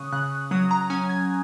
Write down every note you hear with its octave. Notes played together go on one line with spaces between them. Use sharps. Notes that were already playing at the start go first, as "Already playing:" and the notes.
Already playing: C#3 C#4 C#6 D#6 F#6
C#3 F#6
F#3 D#6
A#5
C#4 G#5
G#6